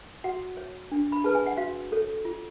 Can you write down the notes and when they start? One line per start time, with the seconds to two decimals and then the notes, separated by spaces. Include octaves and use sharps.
0.24 F#4 F#5
0.57 C#5
0.91 D4
1.12 B5
1.24 G#4 B4 A5
1.35 G#5
1.46 F#5
1.57 F#4 F5
1.92 A4 C#5
2.25 F4